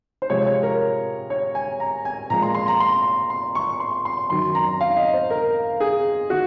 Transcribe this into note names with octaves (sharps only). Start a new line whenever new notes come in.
C5
C3 F3 G#3 C#5
C#5
A#4
C#5
G#5
A#5
G#5
A#2 F3 G#3 A#5
C6
C6
A#5
C6
C6
C#6
C6
C6
F#2 D#3 F#3 C6
A#5
F5
D#5
C5
A#4
G#4
D#3 F#4